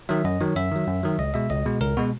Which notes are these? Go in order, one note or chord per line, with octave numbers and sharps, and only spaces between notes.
D#3 F#3 E5
F#2 D#5
D#3 F#3 C#5
F#2 E5
D#3 F#3
F#2
D#3 F#3
C#2 D#5
B2 G#3 E5
C#2 D#5
B2 G#3
C#2 A#4
B2 G#3 F#4